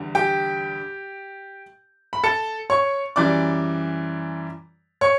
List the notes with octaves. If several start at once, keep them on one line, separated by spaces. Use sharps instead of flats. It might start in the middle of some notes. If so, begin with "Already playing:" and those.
Already playing: E2 D3 G3
G4 G5
B5
A4 A5
C#5 C#6
F#2 E3 G3 D5 D6
C#5 C#6